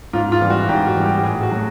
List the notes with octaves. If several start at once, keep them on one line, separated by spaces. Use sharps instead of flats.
G#2 F4
F4
E3 G3
F#4
G#2 G4
F#4
E3 G3
G4
A2 G#4
F#4
F#3 A3